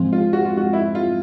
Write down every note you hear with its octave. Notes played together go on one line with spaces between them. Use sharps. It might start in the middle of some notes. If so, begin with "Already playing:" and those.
Already playing: G#2 F3 G#3 C4
F4
F#4
F4
F#4
E4
F4